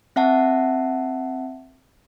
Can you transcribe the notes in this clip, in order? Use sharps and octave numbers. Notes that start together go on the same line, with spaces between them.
C4 E5 F#5 A5